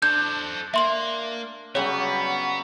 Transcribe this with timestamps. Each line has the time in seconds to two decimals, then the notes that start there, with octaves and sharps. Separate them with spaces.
0.02 D4 A4 C5 G6
0.74 A#3 E5 C6 F#7
1.75 C#3 F#3 G3 B3 C#5